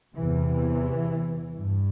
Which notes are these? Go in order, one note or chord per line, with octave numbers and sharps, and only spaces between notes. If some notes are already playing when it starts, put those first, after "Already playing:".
E2 C3 E3
G2